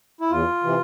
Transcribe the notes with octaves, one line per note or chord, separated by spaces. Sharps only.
E4
E2 F4
C3 E3